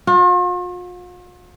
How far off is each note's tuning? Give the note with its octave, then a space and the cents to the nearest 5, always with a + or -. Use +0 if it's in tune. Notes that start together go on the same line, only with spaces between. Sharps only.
F4 +45